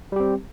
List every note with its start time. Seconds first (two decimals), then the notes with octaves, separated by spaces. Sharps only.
0.12 G3
0.16 G4
0.20 C4